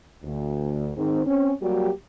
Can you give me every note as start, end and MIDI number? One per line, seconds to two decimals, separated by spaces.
0.24 0.90 38
0.96 1.21 44
0.96 1.21 51
0.96 1.21 60
1.25 1.52 60
1.25 1.52 61
1.62 1.89 54
1.62 1.89 55
1.62 1.89 58
1.62 1.89 66
1.62 1.89 67